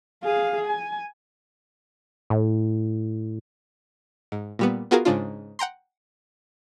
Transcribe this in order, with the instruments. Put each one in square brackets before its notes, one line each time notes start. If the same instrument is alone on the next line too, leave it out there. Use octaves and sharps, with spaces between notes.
[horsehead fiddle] G#4 F5
G#5
[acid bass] A2
[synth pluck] G#2
A#2 G3 B3
B3 F4 F#4 G#4 A#4 F5
G#2 C#3 D4 F4
F#5 G5 A#5 C6